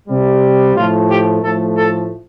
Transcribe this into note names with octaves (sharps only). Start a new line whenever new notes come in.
C3 G3
A2 F3 A3 F4
G4
A2 F3 A3 A4
A4